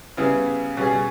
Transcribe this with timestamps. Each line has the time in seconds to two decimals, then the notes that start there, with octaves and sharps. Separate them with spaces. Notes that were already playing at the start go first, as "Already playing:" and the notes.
0.17 C#3 G3 B3 E4 G#4
0.77 B2 G3 C#4 G#4